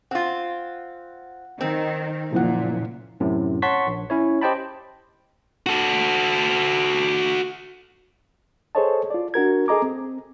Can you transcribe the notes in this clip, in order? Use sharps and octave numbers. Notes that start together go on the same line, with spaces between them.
C4 F4 F#5
D#3 C4
F#1 A#2 F3 F#5
F#2 A2 C3
C#5 F#5 A5 C6 C#6 B6
A#1
C#4 E4 C#5
G4 C5 D#5 G5 A5 B5
F#4 A4
G#4 A4 C5 C#5 D#5 A5
F4 D5
D4 F#4 A#4 G#6
G#4 A4 D#5 A#5 D6
C4